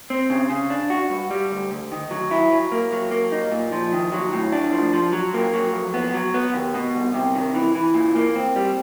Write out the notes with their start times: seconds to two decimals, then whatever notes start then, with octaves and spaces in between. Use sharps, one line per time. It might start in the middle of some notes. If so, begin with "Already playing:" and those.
0.10 C4
0.30 C#3
0.50 C#3
0.70 D4
0.90 F#4
1.10 G2
1.31 G3
1.51 D2
1.71 D2
1.92 D#3
2.11 F#3
2.31 E4
2.52 F#3
2.72 A#3
2.92 F#3
3.11 A#3
3.32 D#4
3.52 A#2
3.72 F3
3.93 D#3
4.12 F#3
4.33 A2
4.52 D4
4.73 F3
4.93 F3
5.13 F#3
5.34 A#3
5.54 F#3
5.73 F2
5.94 B3
6.14 F#3
6.34 B3
6.54 D#2
6.74 B2
6.94 C2
7.14 C3
7.35 D#3
7.55 E3
7.75 E3
7.94 A#2
8.15 A#3
8.36 C4
8.56 G3